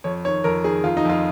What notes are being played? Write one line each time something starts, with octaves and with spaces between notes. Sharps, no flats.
F2 C#5
D#3 C#5
F2 A#4
D#3 G#4
F2 F4
D#4
F2 F4